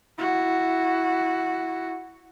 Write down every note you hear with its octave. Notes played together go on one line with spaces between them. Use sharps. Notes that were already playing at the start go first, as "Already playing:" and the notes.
E4 F#4